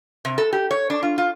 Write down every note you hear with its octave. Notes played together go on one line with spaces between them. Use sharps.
C3
A4
G4
C#5
D4
F4
F4